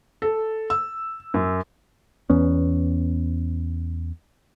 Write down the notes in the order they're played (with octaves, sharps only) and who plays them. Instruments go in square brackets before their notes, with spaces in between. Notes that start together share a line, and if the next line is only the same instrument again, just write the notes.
[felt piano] A4
E6
F#2
[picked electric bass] E2 B3 C#4